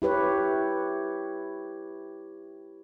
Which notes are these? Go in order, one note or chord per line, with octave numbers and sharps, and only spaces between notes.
E4 G4 B4 C#5